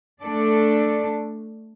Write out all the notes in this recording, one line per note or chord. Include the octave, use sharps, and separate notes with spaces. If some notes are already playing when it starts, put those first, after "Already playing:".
A3 D4 A4 D5